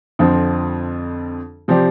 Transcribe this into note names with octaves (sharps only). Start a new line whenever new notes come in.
F2 D3 F3 C4
C3 F3 C4 G4 D5